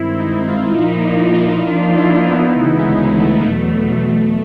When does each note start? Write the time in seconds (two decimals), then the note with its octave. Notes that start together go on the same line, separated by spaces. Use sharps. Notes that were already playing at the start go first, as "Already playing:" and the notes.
Already playing: G2 D#3 G#3 C4 E4
0.20 D#4
0.48 F4
0.78 A#2 F3 A#3 D#4 E4
1.34 F4
1.38 E4
1.68 F3 A#3 D4 D#4 F4
1.98 E4
2.27 B3
2.57 D2 C#3 E3
2.79 G#3
3.02 G#3
3.20 A3
3.24 G#3
3.41 A#3
3.46 E2 B2 F#3 A3